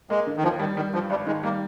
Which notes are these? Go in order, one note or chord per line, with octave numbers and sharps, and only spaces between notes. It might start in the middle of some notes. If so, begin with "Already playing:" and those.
G#3 A#3
D3
D#3
D#2 F3
D#3 G3
D#3 G3
G2 F3
G#1 G3
D#3 G#3
G3 A#3